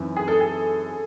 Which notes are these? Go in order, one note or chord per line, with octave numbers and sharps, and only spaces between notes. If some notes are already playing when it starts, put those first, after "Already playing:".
Already playing: F#2 E3 C4 D#4
G#4
A4
G#4